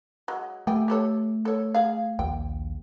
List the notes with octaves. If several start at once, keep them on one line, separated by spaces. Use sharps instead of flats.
F#3 G#3
G3 A3 G5 G#5
G4 A4 C#5
A4 C#5
G#4 F5
A#1 D#2 G5